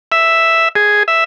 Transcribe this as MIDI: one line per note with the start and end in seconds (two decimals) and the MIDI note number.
0.12 0.69 76
0.75 1.03 68
1.08 1.24 76